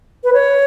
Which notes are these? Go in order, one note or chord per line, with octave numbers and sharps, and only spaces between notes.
B4
C#5